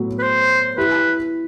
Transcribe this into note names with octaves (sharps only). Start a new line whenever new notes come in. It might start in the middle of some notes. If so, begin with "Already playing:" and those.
Already playing: A2 F#3 B3 F#4
B4
C5
E4 G4 B4